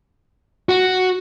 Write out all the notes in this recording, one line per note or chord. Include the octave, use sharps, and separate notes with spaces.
F#4